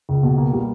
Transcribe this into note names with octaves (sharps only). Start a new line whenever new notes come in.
C#2
B2
A#3
G3